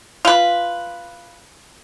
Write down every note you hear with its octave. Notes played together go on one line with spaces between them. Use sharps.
F4 B4